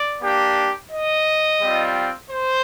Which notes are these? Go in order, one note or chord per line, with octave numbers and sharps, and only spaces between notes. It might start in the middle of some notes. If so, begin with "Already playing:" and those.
Already playing: D5
A#3 D4 G4
D#5
G3 C4 F4
C5